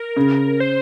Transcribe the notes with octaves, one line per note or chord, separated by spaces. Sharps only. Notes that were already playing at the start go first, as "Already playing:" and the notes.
Already playing: A#4
C#3
C5